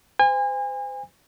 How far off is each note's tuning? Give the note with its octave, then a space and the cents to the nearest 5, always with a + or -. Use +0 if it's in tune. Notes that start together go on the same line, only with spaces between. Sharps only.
C5 -35 G#5 -35